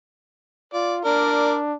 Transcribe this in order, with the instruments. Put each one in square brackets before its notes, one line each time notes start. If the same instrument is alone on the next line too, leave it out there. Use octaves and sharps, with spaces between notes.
[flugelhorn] F4 [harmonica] D5
[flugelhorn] D4 [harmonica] A#4 D5